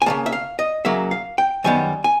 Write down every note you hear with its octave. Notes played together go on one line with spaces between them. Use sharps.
G#5
C#3 F#3 A#3 A5
E5
F5
D#5
C#3 F#3 A#3 E5
F5
G5
F#2 D#3 G3 B3 G#5
G#5